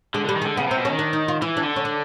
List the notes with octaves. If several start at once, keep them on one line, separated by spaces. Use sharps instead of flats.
D3 G#3
D3 G3
D#3
D3 G#3
C#3 B3
C3 C4
B2
D#3 C#4
D4
D#4
F4
E3 E4
D4
D3
C#4
D4